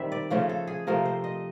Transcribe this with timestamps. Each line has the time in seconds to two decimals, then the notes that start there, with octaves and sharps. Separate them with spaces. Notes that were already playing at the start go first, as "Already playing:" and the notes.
Already playing: D#3 G3 C4 E5
0.12 D5
0.30 C#3 F3 A3 C#4 C#5
0.49 A4
0.67 G#4
0.87 C3 F3 A3 A#4
1.05 C5
1.24 D#5